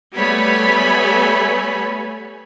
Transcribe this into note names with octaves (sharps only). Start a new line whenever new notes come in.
G3 A3 B3 C#5 G#5 B5